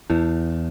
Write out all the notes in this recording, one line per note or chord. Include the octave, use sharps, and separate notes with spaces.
E2 E4